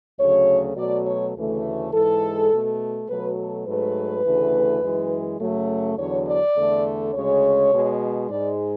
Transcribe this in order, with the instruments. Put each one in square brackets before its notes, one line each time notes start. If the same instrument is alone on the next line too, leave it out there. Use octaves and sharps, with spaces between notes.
[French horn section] D2 C#3 F#3 A3 C#5
B2 F#3 A3 D5
C#5
D2 C#3 E3 A3
G#2 E3 G#3 A4
B2 A3
B2 F#3 A3 B4
A4
G#2 F#3 A3 B4
D2 C#3 E3 A3
F#2 E3 G#3
F#2 C#3 F#3 A3
E2 D3 F#3 C#5
D5
E2 D3 A3
D2 C#3 G#3 C#5
B2 G#3
G#2 G#3 D5